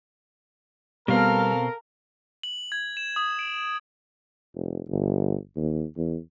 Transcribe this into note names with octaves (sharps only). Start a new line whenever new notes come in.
B2 G3 B3 C4 A4 A#4 F5
F#7
G#6
E7
D#6
D7
F1
G1
D#2
E2